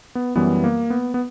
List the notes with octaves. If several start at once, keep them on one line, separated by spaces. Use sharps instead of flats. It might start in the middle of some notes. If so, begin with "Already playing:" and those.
B3
F#2 E3 G3 B3
A#3
B3
B3